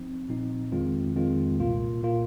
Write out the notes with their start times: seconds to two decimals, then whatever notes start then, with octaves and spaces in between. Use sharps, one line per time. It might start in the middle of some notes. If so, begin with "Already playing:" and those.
Already playing: F3 C4 D#4
0.29 A#2 F3 C4 D#4
0.72 F2 D#3 G#3 C4 F4
1.16 F2 D#3 G#3 C4 F4
1.59 C2 A#2 A#3 F4
2.03 A#2 A#3 F4